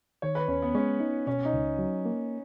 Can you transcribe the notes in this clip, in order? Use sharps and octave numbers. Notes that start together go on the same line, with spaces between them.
D#3 C#5
B4
D#2 C#4
B3
G#3 C#4
D#4
B2 C#4
D#4
C#2
F#3
A#3